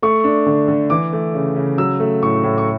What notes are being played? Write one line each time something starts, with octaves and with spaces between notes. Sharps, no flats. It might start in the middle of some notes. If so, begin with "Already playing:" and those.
A3 C#6
D4
D3
D3
E3 D6
A3
C#3
C#3
F#3 E6
A3
A2 C#6
A2
C#6